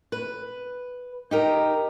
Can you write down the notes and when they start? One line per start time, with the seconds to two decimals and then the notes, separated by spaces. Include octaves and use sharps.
0.12 B4
1.31 D#4 G4 A#4